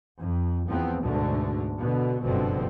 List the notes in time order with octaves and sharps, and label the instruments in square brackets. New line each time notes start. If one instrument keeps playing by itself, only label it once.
[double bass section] F2
E2 F3 B3 C4
D2 G#2 B2 D3 A3
B2 D3 B3
F#1 G2 B2 D3 F3 C4